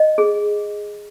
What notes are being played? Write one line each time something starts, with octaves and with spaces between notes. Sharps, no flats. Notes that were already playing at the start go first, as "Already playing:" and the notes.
Already playing: D#5
G#4